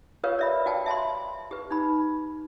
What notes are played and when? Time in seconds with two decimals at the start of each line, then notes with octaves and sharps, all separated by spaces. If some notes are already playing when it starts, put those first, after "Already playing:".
0.23 F4 G4 A#4 B4 C#5 F5
0.39 D5 E5 B5
0.66 F#4 F5 G5 A5
0.86 E5 A5 B5 C6
1.51 G4 B4
1.71 D#4 B5